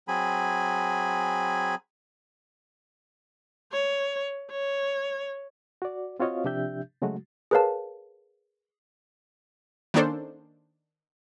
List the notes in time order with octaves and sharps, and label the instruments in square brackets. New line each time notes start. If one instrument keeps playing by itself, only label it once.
[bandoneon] F#3 C4 G#4 G#5 B5
[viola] C#5
C#5
[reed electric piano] F#4 D5
C4 F4 F#4 C#5 D#5 F5
C3 F3 D4 G4 E5 G6
C#3 F#3 G#3 A3 F#4
[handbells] G#4 A#4 B4 C#5 F5 A5
[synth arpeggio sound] D#3 A#3 C#4 D4 A4 C5